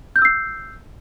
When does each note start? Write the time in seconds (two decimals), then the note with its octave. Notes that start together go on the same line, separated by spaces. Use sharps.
0.16 G6
0.19 F6
0.22 E6
0.25 C7